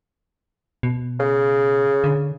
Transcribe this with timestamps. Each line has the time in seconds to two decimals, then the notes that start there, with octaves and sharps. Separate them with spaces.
0.83 B2
1.19 C#3
2.04 D3